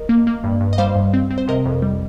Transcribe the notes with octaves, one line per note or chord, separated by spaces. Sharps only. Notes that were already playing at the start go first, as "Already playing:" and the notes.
Already playing: A#4 D#5
A#3
A#3
G2
G2
D#5
G3 C5 F5
G2
C4
C4
C5
C3 A#4 D#5
F2
G3